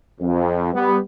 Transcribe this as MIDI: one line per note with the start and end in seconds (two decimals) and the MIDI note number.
0.21 0.72 41
0.74 0.97 55
0.74 0.97 59